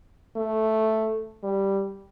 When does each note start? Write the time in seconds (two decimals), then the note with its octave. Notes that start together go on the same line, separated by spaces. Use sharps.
0.36 A3
1.43 G3